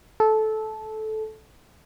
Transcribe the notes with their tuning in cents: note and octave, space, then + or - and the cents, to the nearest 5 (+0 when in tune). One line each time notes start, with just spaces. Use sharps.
A4 -15